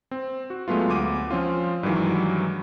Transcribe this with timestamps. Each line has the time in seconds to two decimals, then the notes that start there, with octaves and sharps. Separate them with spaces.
0.11 C4
0.50 F#4
0.68 F#3 G#3 A3 B3 F4
0.90 D2 D6 D#7
1.31 F3 C4 C#4 F4
1.83 G2 D#3 E3 F#3 G#3